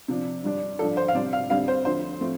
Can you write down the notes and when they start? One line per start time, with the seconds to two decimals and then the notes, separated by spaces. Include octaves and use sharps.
0.08 C3 F3 D4
0.44 G2 G3 D4
0.79 G2 F3 D4 A4
0.97 C5
1.08 F5
1.15 C3 G3 D4 D5
1.33 F5
1.50 D2 D3 G3 C4 F5
1.68 C5
1.85 D2 D3 F3 C5
2.21 F3 A3 C4